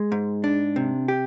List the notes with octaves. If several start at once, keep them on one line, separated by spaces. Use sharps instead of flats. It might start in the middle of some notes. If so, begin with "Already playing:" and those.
Already playing: G#3
G#2
D4
C3
G4